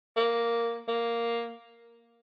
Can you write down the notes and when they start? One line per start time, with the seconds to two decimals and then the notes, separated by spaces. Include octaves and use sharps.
0.16 A#3
0.88 A#3